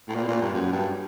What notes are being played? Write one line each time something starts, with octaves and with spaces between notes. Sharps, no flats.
A2
A#2
B2
A#2
G2
F#2
G2